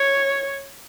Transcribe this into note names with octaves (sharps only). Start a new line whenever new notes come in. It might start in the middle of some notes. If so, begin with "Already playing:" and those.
Already playing: C#5